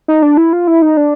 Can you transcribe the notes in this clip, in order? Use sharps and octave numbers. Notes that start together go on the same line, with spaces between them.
D#4
D4
E4
F4
E4
D#4
D4